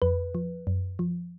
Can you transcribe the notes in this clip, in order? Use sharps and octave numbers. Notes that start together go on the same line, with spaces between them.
F2 B4
F3
F#2
F3